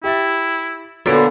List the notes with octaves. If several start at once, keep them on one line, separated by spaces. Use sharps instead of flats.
E4 G4 E5 A6
A#2 D3 B3 F#4 A4 B4 C#5